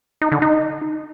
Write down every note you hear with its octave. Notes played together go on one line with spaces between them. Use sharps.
D#4
D3
D#4